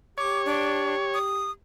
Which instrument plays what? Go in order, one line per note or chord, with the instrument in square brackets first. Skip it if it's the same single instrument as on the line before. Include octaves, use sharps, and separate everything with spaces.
[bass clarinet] G4 [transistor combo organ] C#5 [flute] D6
[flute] D4
D#6